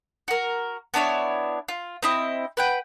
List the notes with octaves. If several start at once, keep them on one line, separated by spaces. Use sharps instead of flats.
F#4 A#4
B3 D4 E4 C#5
F4
C4 E4 D#5
B4 F#5 G5